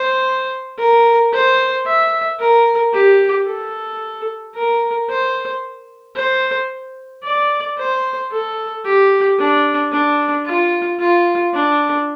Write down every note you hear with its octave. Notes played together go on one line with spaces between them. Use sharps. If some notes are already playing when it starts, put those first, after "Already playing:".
Already playing: C5
A#4
C5
E5
A#4
G4
A4
A#4
C5
C5
D5
C5
A4
G4
D4
D4
F4
F4
D4